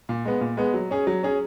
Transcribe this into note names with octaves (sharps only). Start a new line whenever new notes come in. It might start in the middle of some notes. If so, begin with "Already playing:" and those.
A#2
G#3 B3
A#2
G#3 B3
F#3
C#4 G#4
F#3
C#4 G#4